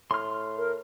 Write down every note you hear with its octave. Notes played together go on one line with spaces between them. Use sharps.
A2 C6 F6
A#4